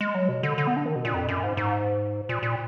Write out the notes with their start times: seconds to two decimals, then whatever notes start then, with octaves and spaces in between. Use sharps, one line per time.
0.01 G#3
0.15 F#3
0.29 B2
0.43 D3
0.58 D3
0.67 B3
0.77 D4
0.86 D#3
0.96 B2
1.05 A#2
1.14 F2
1.29 F#2
1.43 G#2
1.57 G#2
2.29 A#2
2.43 A#2